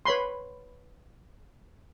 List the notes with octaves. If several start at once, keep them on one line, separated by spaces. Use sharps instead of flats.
B4 C#5 B5 C6